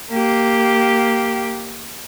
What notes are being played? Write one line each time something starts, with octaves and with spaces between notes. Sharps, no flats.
A#3 G4